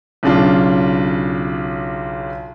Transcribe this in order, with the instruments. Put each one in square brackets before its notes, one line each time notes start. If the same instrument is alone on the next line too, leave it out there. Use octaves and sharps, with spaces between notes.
[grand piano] B1 C#3 D4 F4